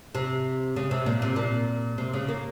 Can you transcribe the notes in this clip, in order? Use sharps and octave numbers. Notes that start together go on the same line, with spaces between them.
C3
C#3
C3
A#2
C3
A#2
C3
C#3
A#3